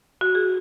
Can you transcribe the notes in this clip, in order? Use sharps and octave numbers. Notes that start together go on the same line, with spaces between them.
F#4
G#4